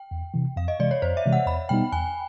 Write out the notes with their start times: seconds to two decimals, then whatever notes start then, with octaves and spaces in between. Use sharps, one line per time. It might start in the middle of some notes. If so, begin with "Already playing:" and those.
Already playing: G5
0.11 E2
0.34 C3 E3
0.56 F2 F5
0.68 D#5
0.80 C3 E3 G#3 D5
0.91 C#5
1.02 F2 C5
1.17 E5
1.25 C3 E3 G#3
1.33 F#5
1.47 E2 B5
1.69 B2 G3 B3 D#4 G5
1.92 E2 G#5